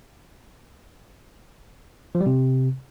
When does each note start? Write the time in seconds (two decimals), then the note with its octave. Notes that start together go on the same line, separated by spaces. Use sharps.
2.15 F3
2.21 G3
2.26 C3